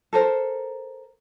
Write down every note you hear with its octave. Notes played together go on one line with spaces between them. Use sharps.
A4 A#4 C5